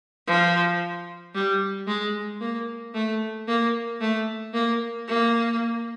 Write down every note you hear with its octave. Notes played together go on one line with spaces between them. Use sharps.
F3
G3
G#3
A#3
A3
A#3
A3
A#3
A#3